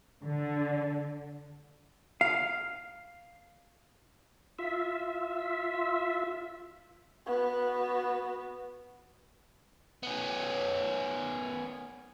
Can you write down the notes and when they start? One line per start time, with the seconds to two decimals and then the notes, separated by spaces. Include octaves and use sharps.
0.24 D3
2.21 F5
4.59 F4 E5
7.27 B3 F#4
10.03 B3 C#4